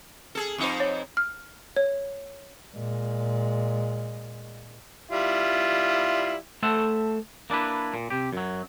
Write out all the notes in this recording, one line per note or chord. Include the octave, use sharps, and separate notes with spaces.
G#4 A4
F2 D#4 C5
C#5
F6
C#5
A#2 G#3
G3 E4 F4
A3 A4 C5 E5 F#5
A#3 D4 E4 B4
A#2
C3 G4
F#2 F#3